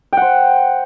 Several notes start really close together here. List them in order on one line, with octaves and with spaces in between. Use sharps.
G5 F#5 C5